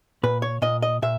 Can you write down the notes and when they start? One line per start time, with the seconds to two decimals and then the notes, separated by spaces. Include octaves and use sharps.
0.23 A#2 B4
0.42 C#5
0.62 A#2 D#5
0.82 D#5
1.02 A#2 E5